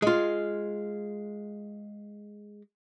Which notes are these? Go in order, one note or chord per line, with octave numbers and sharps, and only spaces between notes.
G#3 F4